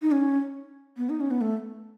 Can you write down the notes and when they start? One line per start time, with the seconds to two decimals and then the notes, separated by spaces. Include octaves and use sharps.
0.02 D#4
0.12 C#4
0.97 B3
1.09 D#4
1.20 C#4
1.31 B3
1.41 A3